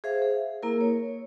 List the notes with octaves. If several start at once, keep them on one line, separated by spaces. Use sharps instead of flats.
G#4 C5 E5 F5
G#4
A#3 E4 A#4
C#5